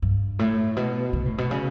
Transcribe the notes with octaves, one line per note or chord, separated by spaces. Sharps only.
G2
A2
B2
C#3
A2
B2
C#3